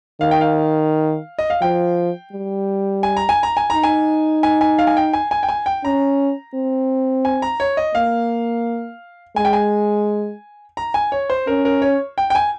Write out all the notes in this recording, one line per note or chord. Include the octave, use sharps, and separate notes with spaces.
D#3 F5
G5
F5
D#5
F5
F3 G5
G3
G#5
A#5
G#5
A#5
G#5
D#4 A#5
G#5
G#5
G#5
F5
G#5
G5
G#5
G#5
G5
G#5
G5
C#4 A#5
C4
G#5
A#5
C#5
D#5
A#3 F5
G#3 G#5
G5
G#5
A#5
G#5
C#5
C5
C#4 A#4
A#4
C#5
G5
G5
G#5